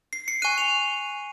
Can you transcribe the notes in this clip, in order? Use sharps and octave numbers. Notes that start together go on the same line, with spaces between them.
C7
C#7
G#5 C#6 F#6 D#7
F7